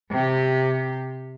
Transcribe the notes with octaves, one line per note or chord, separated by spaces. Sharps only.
C3 G4